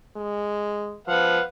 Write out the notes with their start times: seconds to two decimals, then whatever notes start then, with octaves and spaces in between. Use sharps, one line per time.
0.16 G#3
1.08 F3 B4 F5 F#5